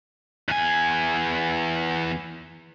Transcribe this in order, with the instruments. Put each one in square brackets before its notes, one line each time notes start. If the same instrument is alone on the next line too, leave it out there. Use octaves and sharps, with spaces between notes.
[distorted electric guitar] E2 G#5